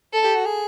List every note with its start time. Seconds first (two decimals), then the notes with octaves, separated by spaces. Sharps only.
0.13 A4
0.24 G4
0.35 F#4
0.46 G#4